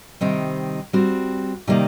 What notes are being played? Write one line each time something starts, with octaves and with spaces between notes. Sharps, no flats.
C3 D#3 G3 C4 D#4
G3 C4 F#4
C3 D#3 G3 A#3 D#4